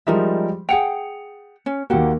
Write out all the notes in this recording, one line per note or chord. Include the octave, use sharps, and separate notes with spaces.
F3 G3 G#3 D#4 A#4 E5
G#4 F#5 G5 C#7 F7
C#4
D#2 A#3 F#4 G4 F#5